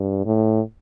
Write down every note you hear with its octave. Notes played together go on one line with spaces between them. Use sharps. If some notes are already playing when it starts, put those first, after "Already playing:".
Already playing: G2
A2